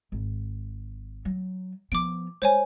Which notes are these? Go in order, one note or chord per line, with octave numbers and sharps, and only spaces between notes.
G#1
F#3
F3 B3 D6 D7
G#3 C5 C#5 G#5